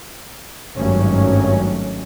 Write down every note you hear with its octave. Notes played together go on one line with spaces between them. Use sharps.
G#1 G2 D#3 F#3 A3 C#4